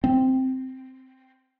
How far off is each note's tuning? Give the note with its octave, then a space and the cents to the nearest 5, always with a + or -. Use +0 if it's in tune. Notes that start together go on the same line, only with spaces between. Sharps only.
C4 -5